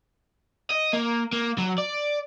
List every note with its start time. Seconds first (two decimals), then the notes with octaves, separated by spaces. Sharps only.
0.71 D#5
0.94 A#3
1.33 A#3
1.58 F#3
1.78 D5